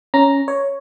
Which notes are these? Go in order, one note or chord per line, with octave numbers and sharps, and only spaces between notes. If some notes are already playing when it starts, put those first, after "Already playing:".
C#4 A#5
C#5